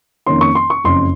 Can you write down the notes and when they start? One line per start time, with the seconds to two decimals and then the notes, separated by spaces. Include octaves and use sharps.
0.26 F2 D#3 A#3 C#4 C6
0.41 C#6
0.55 C6
0.70 C#6
0.84 F#1 F2 C#3 C6